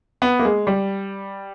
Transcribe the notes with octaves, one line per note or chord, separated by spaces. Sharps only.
B3
A#3
G#3
G3